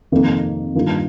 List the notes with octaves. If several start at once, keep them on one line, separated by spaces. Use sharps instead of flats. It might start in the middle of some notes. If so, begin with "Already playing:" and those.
F2 C3 D#3 A#3
G2 D#3 A#3 F4